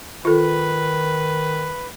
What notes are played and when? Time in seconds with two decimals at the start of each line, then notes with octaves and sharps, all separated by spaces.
0.25 D#3 F4 A4 B4